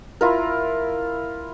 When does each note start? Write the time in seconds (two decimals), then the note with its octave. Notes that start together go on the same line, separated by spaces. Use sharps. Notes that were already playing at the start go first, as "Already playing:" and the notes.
0.21 E4 F4 A#4